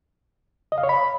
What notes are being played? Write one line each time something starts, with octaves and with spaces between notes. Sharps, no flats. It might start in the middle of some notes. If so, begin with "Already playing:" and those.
D#5
F5
C#5
B5